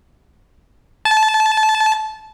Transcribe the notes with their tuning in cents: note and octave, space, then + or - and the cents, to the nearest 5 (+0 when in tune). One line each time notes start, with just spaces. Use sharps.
A5 -20